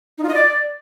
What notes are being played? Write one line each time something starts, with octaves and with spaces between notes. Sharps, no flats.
D#4
F4
D#5
D5